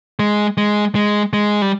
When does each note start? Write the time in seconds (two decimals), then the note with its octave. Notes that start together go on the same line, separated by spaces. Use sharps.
0.19 G#3
0.57 G#3
0.95 G#3
1.33 G#3
1.62 G3